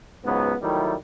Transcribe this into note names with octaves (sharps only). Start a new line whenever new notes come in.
C#2 G#2 F#3 B3
D#3 F#3 G3 A3 E4